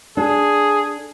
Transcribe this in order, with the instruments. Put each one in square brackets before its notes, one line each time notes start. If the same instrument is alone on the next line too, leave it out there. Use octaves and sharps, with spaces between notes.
[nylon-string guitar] D4 A4 [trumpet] G#4